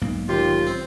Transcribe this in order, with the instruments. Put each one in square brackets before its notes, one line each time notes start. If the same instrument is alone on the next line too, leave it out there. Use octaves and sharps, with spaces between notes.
[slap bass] B1 G#2 A#3
[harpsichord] D#2 [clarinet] F4 [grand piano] G4
[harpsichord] C4